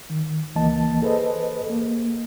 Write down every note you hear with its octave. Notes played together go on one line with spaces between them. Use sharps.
D#3
C#2 E3 A#3 D#5 A5
G#4 A4 B4 C5 D#5
A#3